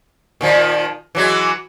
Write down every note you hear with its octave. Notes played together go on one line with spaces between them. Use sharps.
A#2 D#3 F3
E3 F#3 G#3